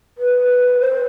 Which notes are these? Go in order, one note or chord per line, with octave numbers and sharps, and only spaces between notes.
B4
C5